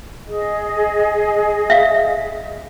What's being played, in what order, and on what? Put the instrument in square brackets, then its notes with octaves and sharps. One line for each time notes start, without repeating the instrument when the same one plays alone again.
[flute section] G#4 D#5
[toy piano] E5 F5